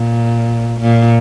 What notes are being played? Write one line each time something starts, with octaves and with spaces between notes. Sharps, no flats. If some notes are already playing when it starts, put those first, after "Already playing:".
Already playing: A#2
A#2